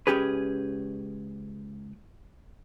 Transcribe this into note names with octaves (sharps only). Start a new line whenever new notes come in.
C#2 A#2 C#4 G4 G#4 B4